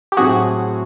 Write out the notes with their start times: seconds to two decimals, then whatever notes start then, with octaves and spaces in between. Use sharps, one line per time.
0.12 G4
0.17 A2 F#3 A3 C4 F#4 G#4